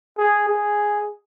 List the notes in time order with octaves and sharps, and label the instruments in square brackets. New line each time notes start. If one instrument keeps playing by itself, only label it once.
[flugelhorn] G#4
G#4